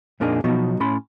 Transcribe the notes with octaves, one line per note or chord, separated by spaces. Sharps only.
F2 A#2 A#3 D4 D#4 G#4
B2 F3 F#3 B3 D#4 F#4
A2 C#4 B5 C6